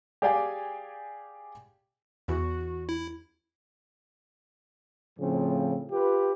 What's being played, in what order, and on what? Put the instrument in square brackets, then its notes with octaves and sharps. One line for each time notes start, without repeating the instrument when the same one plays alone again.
[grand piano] G4 G#4 D5 F5 G5 G#5
[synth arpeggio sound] E2 [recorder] F#4
[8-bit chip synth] E4
[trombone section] A2 C#3 F3 C4
F4 G4 B4